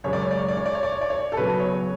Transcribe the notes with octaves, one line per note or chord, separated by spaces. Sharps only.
F#2 C#3 G#3 C#5
D5
C#5
D5
C#5
D5
C#5
D5
C#5
D5
C#5
D5
C#5
A4
C#3 F#3 B3 B4
C#5